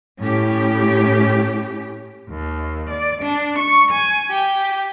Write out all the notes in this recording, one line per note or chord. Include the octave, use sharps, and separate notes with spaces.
A2 C#4 G4
D#2
D5
D4
C#6
G#5
G4